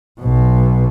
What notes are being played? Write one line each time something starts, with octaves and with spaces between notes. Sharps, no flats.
B1 B2